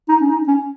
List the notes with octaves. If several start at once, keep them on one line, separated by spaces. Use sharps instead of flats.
D#4
C#4
D#4
C#4